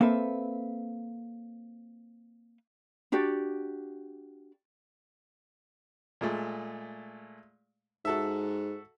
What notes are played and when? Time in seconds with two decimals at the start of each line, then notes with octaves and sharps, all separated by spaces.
0.01 A#3 C4 A4 B4 E5
3.12 D4 F#4 G4 D5
6.21 A#2 G#3 A3
8.05 G#2 F#4 A4 E5